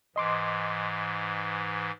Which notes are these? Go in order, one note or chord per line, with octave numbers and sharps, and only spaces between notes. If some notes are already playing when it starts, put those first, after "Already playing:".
G#2 E3 D#5 C6 D6